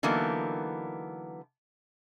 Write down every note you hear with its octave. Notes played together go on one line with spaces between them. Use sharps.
D3 E3 F#3 A#3 B3 D#4